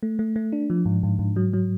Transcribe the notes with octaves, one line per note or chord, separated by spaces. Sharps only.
A3
A3
A3
D4
F3
G#2
G#2
G#2
F#3
F#3